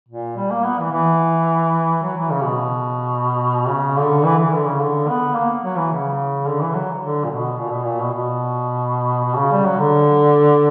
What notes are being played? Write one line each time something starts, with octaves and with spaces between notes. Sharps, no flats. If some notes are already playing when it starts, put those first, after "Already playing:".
A#2
G3
A#3
B3
E3
E3
F#3
E3
C#3
B2
C#3
D3
E3
E3
D3
C#3
D3
B3
A#3
F#3
E3
C#3
D3
E3
F#3
D3
A#2
B2
A#2
B2
A#2
B2
B2
B2
C#3
G3
F#3
D3